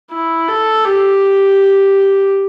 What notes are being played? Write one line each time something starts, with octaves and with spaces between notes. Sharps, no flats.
E4
A4
G4